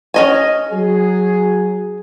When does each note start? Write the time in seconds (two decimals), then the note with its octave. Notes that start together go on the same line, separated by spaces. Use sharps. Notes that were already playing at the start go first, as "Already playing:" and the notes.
0.14 C#4 D#5 G#5
0.71 F#3 G#4